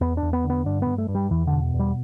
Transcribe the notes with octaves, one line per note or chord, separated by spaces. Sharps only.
E2 B3
D4
E2
B3
D3
B3
G2 D4
G2 B3
A3
G2
G3
E2 E3
D3
B2
E2
G3